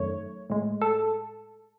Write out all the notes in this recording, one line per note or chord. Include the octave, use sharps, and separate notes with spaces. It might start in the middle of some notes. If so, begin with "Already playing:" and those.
Already playing: F#2 D#3 A3 C#5
A2 G#3
A4